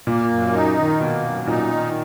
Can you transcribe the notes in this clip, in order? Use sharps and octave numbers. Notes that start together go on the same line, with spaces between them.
A#2 A#3
F#2
D#4
D#3
B2 A#3
F#2
A#2 D#4
D#3